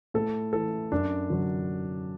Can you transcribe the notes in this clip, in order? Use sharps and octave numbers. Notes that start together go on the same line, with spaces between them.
A2 A4
E3 A4
F#2 D4
D3 F#3